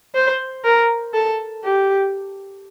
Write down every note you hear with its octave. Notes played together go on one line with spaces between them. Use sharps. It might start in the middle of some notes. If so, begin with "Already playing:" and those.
C5
A#4
A4
G4